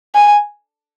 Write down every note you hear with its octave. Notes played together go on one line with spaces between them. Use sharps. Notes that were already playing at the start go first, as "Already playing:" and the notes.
G#5